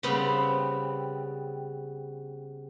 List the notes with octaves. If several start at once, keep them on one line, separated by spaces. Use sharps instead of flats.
C#3 G3 B3 C4